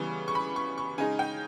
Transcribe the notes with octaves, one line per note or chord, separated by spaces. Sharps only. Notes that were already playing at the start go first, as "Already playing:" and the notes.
Already playing: C#3 E3 G3 B3 C#6
C#6
B5
C#6
C#6
C#3 G#3 D#4 G#5
G5